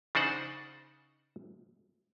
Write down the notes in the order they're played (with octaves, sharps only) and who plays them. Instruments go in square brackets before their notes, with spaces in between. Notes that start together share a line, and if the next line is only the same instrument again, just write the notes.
[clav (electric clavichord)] C#3 D4 D#4 C5 F#5